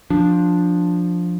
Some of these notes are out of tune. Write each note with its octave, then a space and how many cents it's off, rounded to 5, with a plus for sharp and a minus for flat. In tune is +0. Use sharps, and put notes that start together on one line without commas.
F3 +10 D4 +0